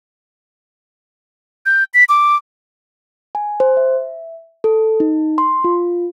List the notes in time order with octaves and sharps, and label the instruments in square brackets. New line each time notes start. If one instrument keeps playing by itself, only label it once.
[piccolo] G6
B6
D6
[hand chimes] G#5
C5
E5
A4
D#4
C6
F4